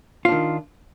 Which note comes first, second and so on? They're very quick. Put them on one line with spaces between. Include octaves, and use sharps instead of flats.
F4 D4 D#3